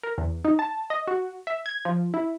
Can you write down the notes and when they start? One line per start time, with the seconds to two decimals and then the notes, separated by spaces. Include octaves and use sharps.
0.03 A#4
0.18 E2
0.45 D#4
0.59 A5
0.90 D#5
1.08 F#4
1.47 E5
1.66 G#6
1.85 F3
2.14 E4